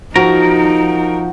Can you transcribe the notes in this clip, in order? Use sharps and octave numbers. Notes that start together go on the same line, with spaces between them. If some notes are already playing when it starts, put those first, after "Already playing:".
F3 D#4 F#4 A#4